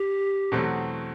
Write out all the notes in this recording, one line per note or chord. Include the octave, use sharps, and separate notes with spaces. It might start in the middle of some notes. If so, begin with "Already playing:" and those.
Already playing: G4
E2 B2 F#3 A3 C4